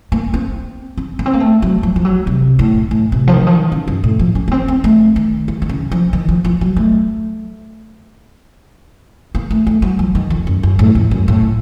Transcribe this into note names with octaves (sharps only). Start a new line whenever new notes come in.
A#3
C4
C4
A#3
C4
A#3
A3
F#3
F3
F3
F#3
C3
A2
A2
C3
F3
D#3
F3
D#3
C#3
F#2
A2
F3
C#4
A#3
C4
C4
A3
D#3
D#3
D#3
C#3
F3
D#3
F3
F3
F#3
A3
A#3
A3
A3
F#3
F3
D#3
F2
F#2
F#2
A2
F2
F#2
A2